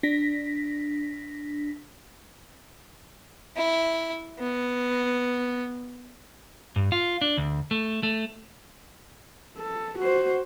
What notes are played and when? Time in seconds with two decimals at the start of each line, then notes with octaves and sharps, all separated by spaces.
0.03 D4 A#6 B6
3.56 E4
4.39 B3
6.76 G2
6.92 F4
7.22 D4
7.37 D2
7.71 A3
8.03 A3
9.58 A4
9.99 F#4 C5